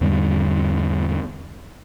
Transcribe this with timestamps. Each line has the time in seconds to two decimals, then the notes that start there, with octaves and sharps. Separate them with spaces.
0.01 E2 G#2 D3 G3